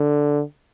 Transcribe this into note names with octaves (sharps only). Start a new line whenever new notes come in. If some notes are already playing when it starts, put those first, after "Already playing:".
Already playing: D3